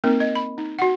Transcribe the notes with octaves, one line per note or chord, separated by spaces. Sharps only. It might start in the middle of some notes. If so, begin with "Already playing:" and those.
A#3 C4 D#4 A#4
D#5
B5
D#4
F#4 F#5